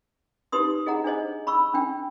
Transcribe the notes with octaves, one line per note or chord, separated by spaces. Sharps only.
D#4 G4 B4 C6 D#6
G#4 D#5 F#5 A#5
D4 G#4 C5 D#5
B5 C#6 E6
C#4 D4 G5